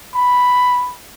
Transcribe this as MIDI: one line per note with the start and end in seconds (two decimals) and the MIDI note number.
0.15 0.93 83